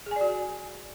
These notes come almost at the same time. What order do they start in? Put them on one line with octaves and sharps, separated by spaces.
G#4 G#5 D5 F#4